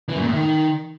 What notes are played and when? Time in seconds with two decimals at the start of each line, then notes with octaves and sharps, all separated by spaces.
0.09 E3
0.15 F#2
0.21 A#2
0.28 A2
0.34 D#3